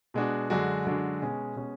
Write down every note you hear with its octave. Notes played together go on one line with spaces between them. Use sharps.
B2 G#3 D4 F#4
F#2 D3 G#3 D4 F#4
F#2 D3 G#3 D4 F#4
B2 G#3 C#4
B2 G#3 C#4